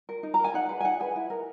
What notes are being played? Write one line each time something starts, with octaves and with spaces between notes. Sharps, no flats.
A#4
D#4
A#5
A#4
G#5
D#4 F#5
G#4 B4
G#5
D#4 F#5
G#4 B4 G#5
E4
A#4